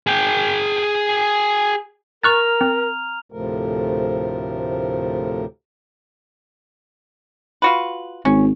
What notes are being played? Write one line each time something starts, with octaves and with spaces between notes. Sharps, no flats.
G#4 G5
A#4 A#5 C#6 F6 F#6 A6 F7
C4
D2 A2 C3 F3 A3 A#4
F4 F#4 B4
G#1 C#4